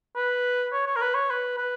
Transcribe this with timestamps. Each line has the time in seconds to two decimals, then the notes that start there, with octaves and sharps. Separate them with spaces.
0.16 B4
0.73 C#5
0.86 C#5
0.96 A#4
1.01 B4
1.15 C#5
1.30 B4
1.58 B4